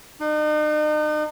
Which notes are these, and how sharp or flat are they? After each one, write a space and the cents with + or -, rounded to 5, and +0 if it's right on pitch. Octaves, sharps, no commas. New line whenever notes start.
D#4 -40